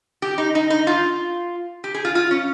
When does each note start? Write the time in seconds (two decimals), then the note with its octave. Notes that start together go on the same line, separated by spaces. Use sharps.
0.22 G4
0.38 D#4
0.55 D#4
0.70 D#4
0.87 F4
1.84 G4
1.94 G#4
2.05 F4
2.15 F4
2.31 C#4